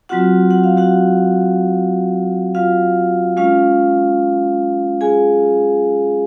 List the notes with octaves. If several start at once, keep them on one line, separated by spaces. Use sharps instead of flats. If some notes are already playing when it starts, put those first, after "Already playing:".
F#3 C4 F4 F#4 F#5
F#5
F5
F#4 F#5
F4 F5
G#3 C#4 F4 F5
G#4 G#5